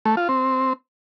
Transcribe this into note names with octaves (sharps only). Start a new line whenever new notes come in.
A3
F4
C4